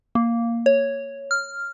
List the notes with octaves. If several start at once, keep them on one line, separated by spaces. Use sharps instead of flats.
A#3
C#5
F6